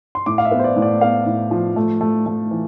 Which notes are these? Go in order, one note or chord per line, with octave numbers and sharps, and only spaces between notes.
C6
A2 D6
F5
E5
B3
C5
D5
A2
D5
B3 F5
A2
F3
A3
A3
A3
E3